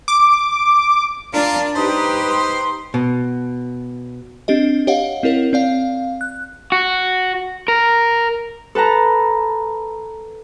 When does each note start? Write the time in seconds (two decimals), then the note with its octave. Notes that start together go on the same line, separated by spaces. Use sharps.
0.08 D6
1.34 D4 F4 A#4
1.76 D#4 G4 B4 C5
2.30 C6
2.94 B2
4.48 C4 D4 G4 D#5
4.87 G4 C#5 D#5 F5 F#5
5.23 C4 E4 A#4 C#5
5.53 C4 D5 F5
6.21 F#6
6.72 F#4
7.68 A#4
8.75 A4 B4 A5 A#5